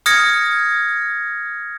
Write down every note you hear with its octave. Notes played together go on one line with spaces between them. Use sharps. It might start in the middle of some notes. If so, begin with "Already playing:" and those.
D#6 F6 G#6 A#6 C#7